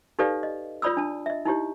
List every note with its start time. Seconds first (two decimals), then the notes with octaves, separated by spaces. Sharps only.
0.19 D#4 G4 A4 B4 D5 F5
0.43 D#5
0.82 F4 C#5 D5 B5 D#6 E6
0.97 D4 A5
1.26 D#5 E5
1.45 D#4 E4 G4 C#5